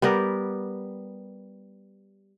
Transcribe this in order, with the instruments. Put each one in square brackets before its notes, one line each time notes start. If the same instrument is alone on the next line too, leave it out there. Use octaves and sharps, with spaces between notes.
[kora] G3 B3 G4 A#4